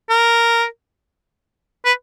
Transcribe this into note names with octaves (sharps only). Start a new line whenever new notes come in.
A#4
B4